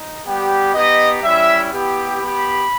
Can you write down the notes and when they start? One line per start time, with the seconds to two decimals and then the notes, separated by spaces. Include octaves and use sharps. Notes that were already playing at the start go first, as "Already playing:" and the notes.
Already playing: D#4
0.26 G3 B3 G4
0.74 B3 D#4 G4 D#5
1.23 G3 C#4 E4 E5
1.72 B3 E4 G4
2.21 B3 G4 B5